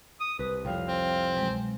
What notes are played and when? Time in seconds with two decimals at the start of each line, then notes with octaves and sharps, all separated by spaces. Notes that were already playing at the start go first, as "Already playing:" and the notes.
0.21 D#6
0.39 C2 B4
0.65 C2 F2 C#5 F5 G5
0.88 C4
1.35 B2 F#3 G#3